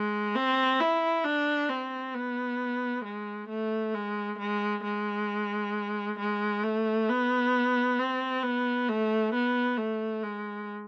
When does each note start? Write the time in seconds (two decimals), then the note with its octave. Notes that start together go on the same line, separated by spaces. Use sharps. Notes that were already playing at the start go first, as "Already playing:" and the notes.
Already playing: G#3
0.35 C4
0.80 E4
1.24 D4
1.69 C4
2.14 B3
3.04 G#3
3.49 A3
3.94 G#3
4.39 G#3
4.84 G#3
6.18 G#3
6.63 A3
7.09 B3
7.99 C4
8.43 B3
8.89 A3
9.34 B3
9.78 A3
10.23 G#3